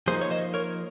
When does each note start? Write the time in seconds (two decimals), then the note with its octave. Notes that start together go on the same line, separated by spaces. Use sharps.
0.07 F3 A#3 D#4 G#4 C5
0.21 C#5
0.31 C5 D#5
0.54 A#4 C#5